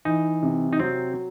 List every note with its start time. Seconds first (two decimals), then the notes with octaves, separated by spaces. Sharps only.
0.05 E3 D#4
0.43 C3
0.73 D#4
0.80 F#3 C4